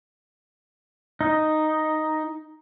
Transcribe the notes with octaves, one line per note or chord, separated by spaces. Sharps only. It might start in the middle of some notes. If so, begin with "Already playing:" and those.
D#4